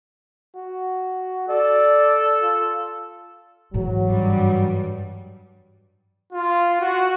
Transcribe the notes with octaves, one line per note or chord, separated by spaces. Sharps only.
F#4
A4 D5
F4
G#2 E3 F#3
G2 G3
F4
F#4